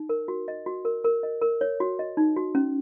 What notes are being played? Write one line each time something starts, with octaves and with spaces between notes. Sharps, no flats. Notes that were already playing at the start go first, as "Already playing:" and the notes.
Already playing: D#4
A#4
F#4
D#5
F#4
A#4
A#4
D#5
A#4
C#5
F#4
D#5
D#4
F#4
C#4